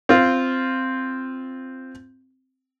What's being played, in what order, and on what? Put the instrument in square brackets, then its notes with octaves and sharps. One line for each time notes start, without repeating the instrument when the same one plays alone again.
[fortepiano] C4 F4